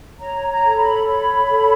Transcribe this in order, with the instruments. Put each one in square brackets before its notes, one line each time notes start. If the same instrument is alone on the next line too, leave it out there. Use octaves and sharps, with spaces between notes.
[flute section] C#5 A#5
A#5
A4
B5
C#5 B5
A4